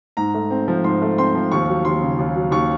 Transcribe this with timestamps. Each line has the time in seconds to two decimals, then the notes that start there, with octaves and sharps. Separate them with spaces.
0.17 G#2 A#5
0.34 A3
0.50 C4
0.68 F3
0.84 G#2 C6
1.02 A3
1.18 C4 C6
1.35 F3
1.52 D#2 C#6
1.69 F#3
1.85 D#2 C6
2.01 C#3
2.19 D#2
2.35 F#3
2.51 D#2 C#6